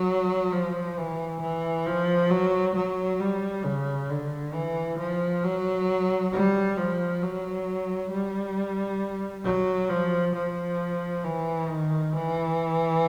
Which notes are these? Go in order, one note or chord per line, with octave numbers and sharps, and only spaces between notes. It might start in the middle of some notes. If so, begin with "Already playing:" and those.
Already playing: F#3
F3
E3
E3
F3
F#3
F#3
G3
C#3
D3
E3
F3
F#3
G3
F3
F#3
G3
F#3
F3
F3
E3
D#3
E3